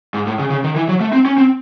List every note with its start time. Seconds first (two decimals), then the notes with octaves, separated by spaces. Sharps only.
0.14 G#2
0.27 A2
0.39 C#3
0.50 C#3
0.64 D#3
0.76 E3
0.89 F#3
1.00 A3
1.13 C4
1.26 C#4
1.38 C4